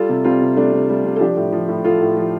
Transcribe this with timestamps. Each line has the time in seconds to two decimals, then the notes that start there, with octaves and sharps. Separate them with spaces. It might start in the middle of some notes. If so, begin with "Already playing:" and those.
Already playing: G3 F4 A4
0.09 C3
0.24 G3 C4 F4
0.42 C3
0.56 G3 A3 D4
0.72 C3
0.89 G3
1.05 C3
1.16 A4
1.20 F3 D4 G4
1.37 A2
1.52 F3
1.68 A2
1.84 F3 F4 A4
2.01 A2
2.17 F3